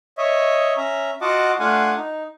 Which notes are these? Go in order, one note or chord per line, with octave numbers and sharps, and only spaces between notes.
C#5 D#5 E5
C#4 E5 A#5
F4 F#4 D#5 F#5 A5 D6
A3 D4 F4 F5 F#5 G#5
D#4